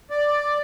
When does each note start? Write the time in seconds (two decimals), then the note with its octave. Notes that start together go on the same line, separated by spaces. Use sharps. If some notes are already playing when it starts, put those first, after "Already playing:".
0.10 D5